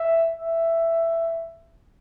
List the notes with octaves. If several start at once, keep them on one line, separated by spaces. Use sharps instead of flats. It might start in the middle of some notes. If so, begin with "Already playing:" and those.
Already playing: E5
E5